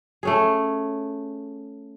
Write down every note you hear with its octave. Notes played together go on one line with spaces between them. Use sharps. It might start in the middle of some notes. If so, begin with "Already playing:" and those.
A3 C#4 G#4